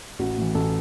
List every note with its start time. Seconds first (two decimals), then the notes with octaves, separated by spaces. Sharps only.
0.19 A1 F#4
0.38 A2 E3
0.55 A1 A4